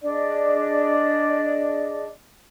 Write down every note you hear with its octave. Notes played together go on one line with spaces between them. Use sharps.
D4 G#4 D5 D#5